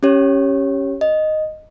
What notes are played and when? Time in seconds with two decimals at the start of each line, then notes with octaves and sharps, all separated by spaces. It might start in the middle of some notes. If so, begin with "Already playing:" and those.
0.03 C#4 G4 C#5
1.01 D#5